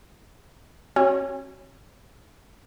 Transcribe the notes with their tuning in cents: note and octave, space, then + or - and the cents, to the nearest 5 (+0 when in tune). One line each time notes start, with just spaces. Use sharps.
C#4 -35 F#4 +20 C#5 +0